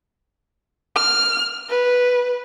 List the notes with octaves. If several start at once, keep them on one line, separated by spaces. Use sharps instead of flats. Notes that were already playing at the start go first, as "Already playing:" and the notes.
F6
B4